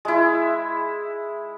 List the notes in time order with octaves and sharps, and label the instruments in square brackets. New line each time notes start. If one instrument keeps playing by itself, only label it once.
[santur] G#3 E4